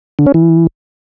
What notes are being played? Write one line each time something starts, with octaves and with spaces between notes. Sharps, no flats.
D3
C#4
E3